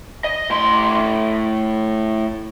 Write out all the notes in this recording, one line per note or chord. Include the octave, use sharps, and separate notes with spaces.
D#5
A2 C6